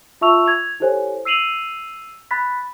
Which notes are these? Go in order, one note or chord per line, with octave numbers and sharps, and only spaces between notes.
F4 E5 A5 C#6 E6 F7
G#6 F7
E4 G4 A4 C5 C#5 G#5
E6 C7 D#7 F7 F#7
B5 F#6 A6 B6